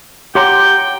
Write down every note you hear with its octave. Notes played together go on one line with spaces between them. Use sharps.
G4 C#5 F#5 G5 A#5 C6 D6